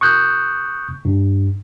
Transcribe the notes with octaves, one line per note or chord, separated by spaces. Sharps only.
C#6 D#6 F#6 G6
G2